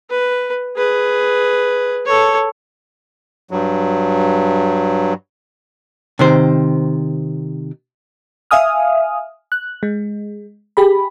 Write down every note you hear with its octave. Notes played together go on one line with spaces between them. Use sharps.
B4
G#4 B4
A4 C#5
G2 F#3
C3 D#3 C5
E5 F5 G#5 D#6 F6
F#6
G#3
G4 G#4 B5